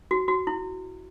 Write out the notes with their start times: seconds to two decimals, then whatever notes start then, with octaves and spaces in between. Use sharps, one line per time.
0.11 F#4
0.28 F#4
0.47 E4